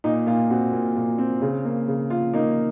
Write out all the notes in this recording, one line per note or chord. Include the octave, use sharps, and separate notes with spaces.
A#2 D#4
A#2 F4
C4 F#4
A#2
A#2
C4
C#3
A#3
C#3
A#3 F4
A#3 D#4